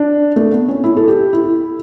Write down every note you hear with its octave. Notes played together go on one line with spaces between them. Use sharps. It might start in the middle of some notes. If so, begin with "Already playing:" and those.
Already playing: D4
A3
B3
C#4
E4
A4
G4
E4